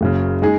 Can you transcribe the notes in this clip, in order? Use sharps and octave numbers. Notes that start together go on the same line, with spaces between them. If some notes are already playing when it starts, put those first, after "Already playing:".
F#1 F#2 C#3
G#3 D#4 G#4